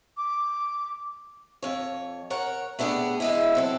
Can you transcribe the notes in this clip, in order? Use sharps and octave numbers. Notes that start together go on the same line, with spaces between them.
D6
F2 C#5
A#4 C#5 F#5
A3 B3 D4 G4 G#4
E3 G#3 E4
F#3 C4 A4